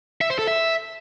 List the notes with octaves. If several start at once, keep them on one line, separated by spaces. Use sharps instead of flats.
E5
C5
A4
E5